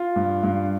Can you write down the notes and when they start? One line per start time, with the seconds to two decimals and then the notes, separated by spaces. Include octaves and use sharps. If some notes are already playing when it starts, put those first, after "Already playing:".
Already playing: F4
0.16 G2
0.43 G2